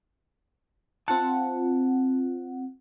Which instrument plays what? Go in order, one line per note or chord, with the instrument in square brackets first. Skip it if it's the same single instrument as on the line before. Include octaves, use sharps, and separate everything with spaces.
[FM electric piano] C4 F4 F#5 [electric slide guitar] A5